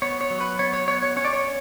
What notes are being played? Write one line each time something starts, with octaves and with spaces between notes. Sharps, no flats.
B3 C#5
C#5
F#3
B4
B3 C#5
C#5
B3 C#5
C#5
C#4 C#5
D5
C#5